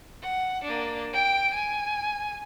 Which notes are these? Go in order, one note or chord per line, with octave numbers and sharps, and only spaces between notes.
F#5
A#3 D4
G5 D7
G#5